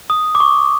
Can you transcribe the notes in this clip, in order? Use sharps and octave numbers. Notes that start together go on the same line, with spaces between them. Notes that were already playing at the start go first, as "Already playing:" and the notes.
D#6
D6
C#6